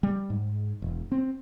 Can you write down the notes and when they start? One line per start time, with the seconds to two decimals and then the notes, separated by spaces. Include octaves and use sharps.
0.03 G3
0.30 G#2
0.82 E1
1.12 C4